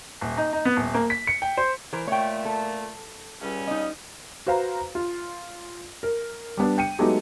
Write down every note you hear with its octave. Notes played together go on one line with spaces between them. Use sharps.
D#1
D#4
D#4
B3
D#1
A#3
B6
C#7
G5
C5
E3 A#4 C5
A#2 A3 C#5 G5
A4
C#2 G3 C#4
D#4 D#5
F#4 B4 C5 F5 A#5
F4
A#4
G3 B3 D4
G5 C#7 D#7
F#3 G#3 A3 B3 D#4 G4